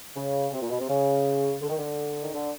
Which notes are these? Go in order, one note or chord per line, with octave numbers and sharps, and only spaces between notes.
C#3
C3
A#2
B2
C3
C#3
D3
D#3
D3
D#3
D3